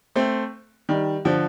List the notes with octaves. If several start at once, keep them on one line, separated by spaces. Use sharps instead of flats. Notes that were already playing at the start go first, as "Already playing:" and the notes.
A3 C4
D#3 G3
D3 F3